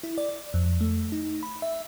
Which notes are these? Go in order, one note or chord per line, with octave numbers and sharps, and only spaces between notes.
E4
D5
F2
A3
D#4
B5
E5